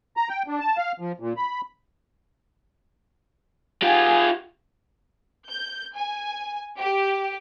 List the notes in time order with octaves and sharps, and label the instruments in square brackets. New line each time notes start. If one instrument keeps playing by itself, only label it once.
[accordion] A#5
G5
D4
A5
F5
F3
A#2
B5
[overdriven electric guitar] F4 G4 [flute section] G#4
[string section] G6
G#5
G4